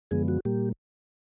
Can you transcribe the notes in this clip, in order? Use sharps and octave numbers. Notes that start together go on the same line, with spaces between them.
F#2 D3 F3 G#3 B3 G#4
F#4
A#2 G3 A#3 G4